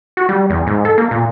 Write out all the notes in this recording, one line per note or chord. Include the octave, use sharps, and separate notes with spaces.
F#4
G3
E2
G#2
A4
A#3
A#2